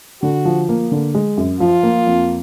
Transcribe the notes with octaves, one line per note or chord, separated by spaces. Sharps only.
D3 F#4
F3
A#3
D3
G#3
F#2
F3 F4
A#3
F2